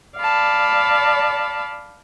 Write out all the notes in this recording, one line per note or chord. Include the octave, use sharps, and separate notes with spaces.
D5 F5 A5 B5